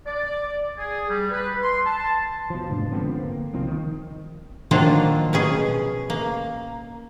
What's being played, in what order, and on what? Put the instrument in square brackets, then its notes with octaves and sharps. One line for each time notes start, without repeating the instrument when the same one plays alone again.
[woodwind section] D5
G#4
G3
B4
C6
A5
[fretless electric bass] B2 F3
F1 G#2 D3
D3 F3 B3 C4
A#3
C2 D#3 F3 C4
D#3
[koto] D#3 F3 F#3 A#3 D4 F4
B2 C#4 G#4
A#3